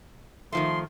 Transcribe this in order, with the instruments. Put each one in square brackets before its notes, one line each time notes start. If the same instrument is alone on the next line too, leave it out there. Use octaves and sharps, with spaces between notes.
[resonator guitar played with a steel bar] D#3 F3 A3 [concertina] C6